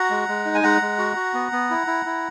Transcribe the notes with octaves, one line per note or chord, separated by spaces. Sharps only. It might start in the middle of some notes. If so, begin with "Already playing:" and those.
Already playing: F#4 F#5 A#5
G#3
G#3
D#4
G#5
G#3 F#5 A#5
G#3
F#4
F#4
B3
B3
E4
E4
E4